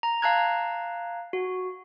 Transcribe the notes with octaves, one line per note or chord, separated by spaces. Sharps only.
A#5
F5 A5 A#5 F#6 G#6
F#4